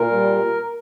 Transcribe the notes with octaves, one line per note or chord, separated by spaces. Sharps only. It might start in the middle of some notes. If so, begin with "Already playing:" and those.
Already playing: A#2 A#4
G3